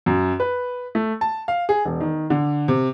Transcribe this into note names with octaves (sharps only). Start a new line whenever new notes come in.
F#2
B4
A3
A5
F5
G#4
E1
D#3
D3
C3